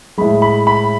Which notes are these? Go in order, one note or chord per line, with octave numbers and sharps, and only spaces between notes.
A2 G#3 B5
B5
B5